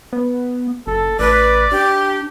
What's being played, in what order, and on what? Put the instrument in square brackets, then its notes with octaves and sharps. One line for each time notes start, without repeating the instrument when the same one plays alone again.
[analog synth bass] B3
[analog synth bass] F#1 [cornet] A4
[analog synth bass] A1 [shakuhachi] B4 [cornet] D5
[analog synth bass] D4 [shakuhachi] G4